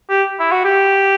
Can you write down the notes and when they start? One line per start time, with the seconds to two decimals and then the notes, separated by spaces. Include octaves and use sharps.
0.09 G4
0.40 E4
0.51 F#4
0.64 G4